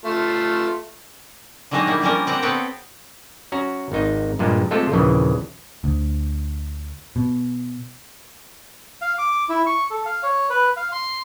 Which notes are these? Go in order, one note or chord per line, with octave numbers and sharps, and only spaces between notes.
A3 F4
D3 D#3 F#3 G#3 A#3 D#4
G3 A#3 E4
D3 F3 G3 C#4 A#4
D3 C4 G4 F#5 A#5
B3 C4 A4 B4 C#5 G5
C#4 F#4 A#5
G#1 D#4
G2 A#2 G#3
G#3 A3 C4 F4 G4 A4
A#1 D#2 C#3 E3
D2
B2
F5
D6
E4
C#6
A4
F5
C#5
B4
F5
C6